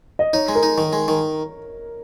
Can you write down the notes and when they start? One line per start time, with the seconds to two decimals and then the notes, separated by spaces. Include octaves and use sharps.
0.19 D#5
0.33 D#4 C#5
0.48 G#3
0.55 A#4
0.63 D#4
0.78 D#3
0.93 G#3
1.08 D#3